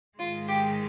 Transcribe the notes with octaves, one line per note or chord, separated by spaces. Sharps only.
G#2 D#3 G#3 F4
G4